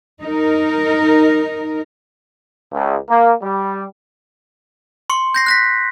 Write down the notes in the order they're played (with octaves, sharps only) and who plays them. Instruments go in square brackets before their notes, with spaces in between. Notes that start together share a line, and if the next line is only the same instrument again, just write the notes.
[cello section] D#4 A#4
[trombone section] C#2
A#3
G3
[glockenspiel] C6 C#6 C#7
G6 A#6 C7
F#6 A#6 B6